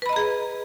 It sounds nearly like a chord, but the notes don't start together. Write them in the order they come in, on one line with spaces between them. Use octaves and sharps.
B4 B5 D#5 A#5 G#4